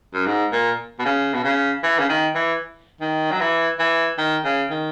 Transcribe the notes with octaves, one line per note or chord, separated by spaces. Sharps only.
F#2
G#2
A#2
B2
C#3
B2
C#3
E3
C#3
D#3
E3
D#3
F#3
E3
E3
D#3
C#3
D#3